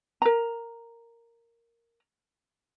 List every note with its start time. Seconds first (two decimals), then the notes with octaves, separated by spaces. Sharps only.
0.22 A#4 A#5